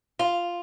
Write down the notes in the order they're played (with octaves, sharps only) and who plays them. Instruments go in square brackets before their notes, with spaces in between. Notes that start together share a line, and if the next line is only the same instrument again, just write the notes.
[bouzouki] F4